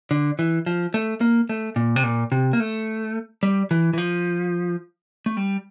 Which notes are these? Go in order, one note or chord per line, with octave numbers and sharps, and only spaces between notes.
D3
E3
F3
A3
A#3
A3
A#2
C3
A#2
C3
A#3
A3
G3
E3
E3
F3
A3
G3